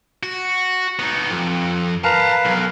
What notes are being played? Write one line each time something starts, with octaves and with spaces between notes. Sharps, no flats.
F#4
B3 D#4
F2
A#4 B4 F5 A5 A#5
B1